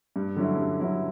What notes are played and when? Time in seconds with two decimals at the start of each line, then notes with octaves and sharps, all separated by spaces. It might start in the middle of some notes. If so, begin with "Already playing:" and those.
0.16 G2
0.36 D3 F#3 C#4 E4
0.58 G2
0.80 D3 F#3 C#4 E4